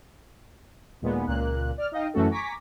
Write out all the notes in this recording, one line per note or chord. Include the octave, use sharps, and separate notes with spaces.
D#2 A#2 G#3 B3
C#2 A#2 A#3 F#6
D5 F6
D#4 D#5 F5 G5
F#2 E3 A3 C#4 F#4 A4
G#5 A#5 C#6 D6 A#6 B6